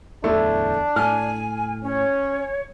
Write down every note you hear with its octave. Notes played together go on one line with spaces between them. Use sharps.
D1 E2 A3 D4 E4
A2 G#5 F6
C#4 C#5